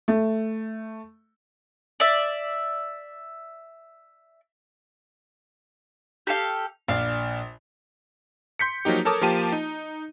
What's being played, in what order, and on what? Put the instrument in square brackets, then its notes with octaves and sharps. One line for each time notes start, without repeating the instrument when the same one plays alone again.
[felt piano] A3
[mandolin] D5 E5
G4 A4 F5
[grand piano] A#1 D4 [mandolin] F5
[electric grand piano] C6 G6 B6 C#7
F3 F#3 A#3 D#4 G4
A4 A#4 C#5 A5 D6 D#6
F3 A#3 F4 G4 A5 D#7
D#4